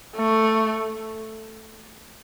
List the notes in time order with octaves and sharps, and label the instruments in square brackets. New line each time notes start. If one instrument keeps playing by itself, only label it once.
[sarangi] A3